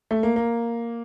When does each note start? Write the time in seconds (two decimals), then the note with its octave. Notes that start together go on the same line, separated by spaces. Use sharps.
0.11 A3
0.23 A#3
0.36 A#3